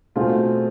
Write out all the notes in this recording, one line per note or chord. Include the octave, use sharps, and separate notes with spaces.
B2 A3 C4 F4 G#4